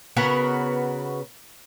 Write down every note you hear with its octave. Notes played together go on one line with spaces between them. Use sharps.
C#3 B3 F#4 A#4